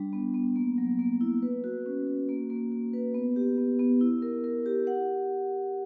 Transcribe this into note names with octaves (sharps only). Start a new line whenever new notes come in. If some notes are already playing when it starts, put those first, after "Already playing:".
Already playing: G3 D4
B3
B3
A#3
F#3
A#3
E4
B4
F#4
C#4
F#4
A#3
A#3
A#3
B4
B3
G4
B3
B3
E4
A#4
A#4
G4
F#5